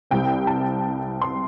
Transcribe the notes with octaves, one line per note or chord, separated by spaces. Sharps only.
C2 C3 G3 C4 G5
A5
C6